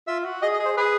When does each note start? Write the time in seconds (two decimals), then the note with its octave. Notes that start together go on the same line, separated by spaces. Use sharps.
0.07 F4 E5
0.25 F#4
0.42 G#4 D#5
0.54 D#5
0.59 G#4
0.65 C5
0.77 G#4 B4